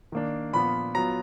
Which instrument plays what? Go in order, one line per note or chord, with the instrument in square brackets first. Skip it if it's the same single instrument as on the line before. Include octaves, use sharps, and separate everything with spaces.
[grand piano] D#3 A#3 D4
A#2 F3 B3 B5
F#3 B3 F4 A#5